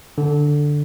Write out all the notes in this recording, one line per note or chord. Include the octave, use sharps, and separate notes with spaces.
D3